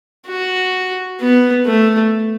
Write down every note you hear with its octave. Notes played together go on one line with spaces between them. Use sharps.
F#4
B3
A3